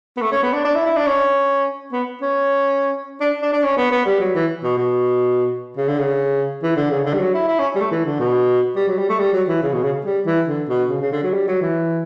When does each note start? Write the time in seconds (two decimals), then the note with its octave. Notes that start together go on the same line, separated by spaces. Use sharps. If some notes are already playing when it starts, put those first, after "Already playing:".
0.16 B3
0.21 A3
0.31 C#4
0.43 B3
0.53 D4
0.64 D4
0.75 E4
0.86 E4
0.96 D4
1.06 C#4
1.92 B3
2.21 C#4
3.20 D4
3.42 D4
3.53 D4
3.63 C#4
3.77 B3
3.91 B3
4.05 G3
4.20 F#3
4.35 E3
4.64 B2
4.77 B2
5.77 C#3
5.88 D3
5.98 C#3
6.63 E3
6.76 D3
6.90 C#3
7.06 D3
7.13 G3
7.19 F#3
7.34 E4
7.48 E4
7.59 C#4
7.75 G3
7.80 A3
7.91 E3
8.05 D3
8.19 B2
8.76 G3
8.88 F#3
8.98 G3
9.09 A3
9.19 G3
9.33 F#3
9.48 E3
9.62 C#3
9.73 B2
9.83 C#3
10.05 G3
10.26 E3
10.48 D3
10.68 B2
10.89 C#3
11.01 C#3
11.12 D3
11.23 F#3
11.33 G3
11.48 F#3
11.61 E3